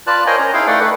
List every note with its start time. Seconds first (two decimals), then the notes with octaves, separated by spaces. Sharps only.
0.07 F4 B4 D5 A5 F#6
0.27 A#4 C5 C#5 D#5 G5 G#5
0.39 C#4 A#5
0.54 D#4 E4 G#4 F5 G5
0.67 A3 B4 D5 F#5 G5
0.80 A3 B4